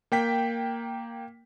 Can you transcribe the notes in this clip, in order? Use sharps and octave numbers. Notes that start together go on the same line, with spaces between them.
A#3 G5 B6